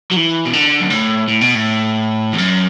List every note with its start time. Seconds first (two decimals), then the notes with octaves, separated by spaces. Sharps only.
0.11 F#3
0.16 E3
0.46 B2
0.53 D3
0.81 F#2
0.90 A2
1.28 A2
1.41 B2
1.55 A2
2.33 E2
2.38 F#2